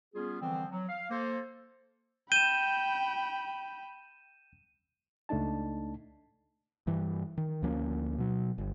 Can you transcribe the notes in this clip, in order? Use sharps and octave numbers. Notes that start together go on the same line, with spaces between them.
G3 B3 C#4 F4 G#4
D3 E3 F3 G3 C4
F#3
F5
A#3 A4 C5
G5 B5 G6 D#7 E7
C#2 A3 D4 D#4 A5
G2 E3
D#3
D2 F3 A#3 C#4
B2 F#3
G1